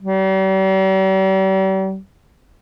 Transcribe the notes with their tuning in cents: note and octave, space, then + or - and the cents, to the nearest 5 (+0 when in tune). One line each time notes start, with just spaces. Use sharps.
G3 -40